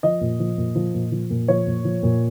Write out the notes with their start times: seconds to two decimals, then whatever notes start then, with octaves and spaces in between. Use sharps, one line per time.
0.03 F3 D#5
0.21 A#2
0.39 F3
0.58 A#2
0.75 F3
0.94 A#2
1.12 F3
1.30 A#2
1.48 F3 C#5
1.67 A#2
1.85 F3
2.03 A#2